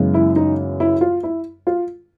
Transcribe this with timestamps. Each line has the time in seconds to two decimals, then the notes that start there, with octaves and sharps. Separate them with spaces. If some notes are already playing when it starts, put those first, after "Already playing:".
Already playing: F#2 C#3 E3 G#3 B3
0.14 E4
0.36 D#4
0.80 E4
1.01 F4
1.23 E4
1.67 F4